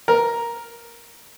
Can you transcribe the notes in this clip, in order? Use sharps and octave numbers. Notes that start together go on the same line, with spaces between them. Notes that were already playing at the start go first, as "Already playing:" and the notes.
A#4